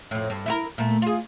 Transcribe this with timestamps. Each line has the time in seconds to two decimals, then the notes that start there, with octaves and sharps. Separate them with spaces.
0.11 F2 A2
0.30 G2
0.46 E4 F#4 A#4
0.78 A#2 A3
1.02 F4 G#4